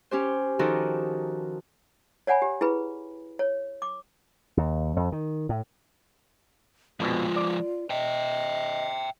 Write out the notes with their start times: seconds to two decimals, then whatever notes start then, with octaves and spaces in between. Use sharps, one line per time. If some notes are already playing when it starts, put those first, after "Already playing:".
0.11 C#4 G4 C5
0.59 D#3 F3 D#4 F#4 G4 A4
2.27 C#5 D5 F#5 G#5 B5
2.42 G4
2.61 E4 G#4 B4 B5
3.39 C#5
3.82 D6
4.57 D#2
4.96 F2
5.12 D#3
5.49 A2
7.00 A#1 F2 B2 F3 G#3 F4
7.36 D5
7.90 D#5 E5 G5